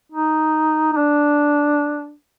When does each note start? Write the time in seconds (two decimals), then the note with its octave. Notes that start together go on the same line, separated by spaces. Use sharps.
0.12 D#4
0.92 D#4
0.97 D4